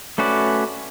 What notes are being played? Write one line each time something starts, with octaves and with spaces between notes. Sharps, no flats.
A3 C#4 F#4 B4 D5